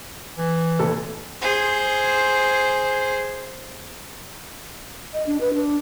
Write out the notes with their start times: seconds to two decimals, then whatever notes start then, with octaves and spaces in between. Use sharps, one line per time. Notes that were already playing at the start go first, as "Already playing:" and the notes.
0.38 E3
0.79 F1 A#2 A4
1.41 G#4 C5
5.13 D#5
5.26 D4
5.41 B4
5.54 D4